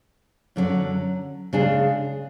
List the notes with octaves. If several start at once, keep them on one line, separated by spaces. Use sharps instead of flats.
F#2 D3 F#3 C#4
C#3 G#3 D4 G#4